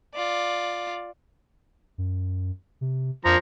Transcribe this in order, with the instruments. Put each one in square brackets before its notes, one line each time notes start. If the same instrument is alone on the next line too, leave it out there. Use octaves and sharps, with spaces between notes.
[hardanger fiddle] F4 D5
[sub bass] F#2
C3
[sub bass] F2 [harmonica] F3 A#5